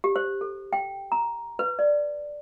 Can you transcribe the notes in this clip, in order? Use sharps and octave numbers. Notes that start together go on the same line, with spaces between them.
G4
C5
A4
G5
A#5
B4
D5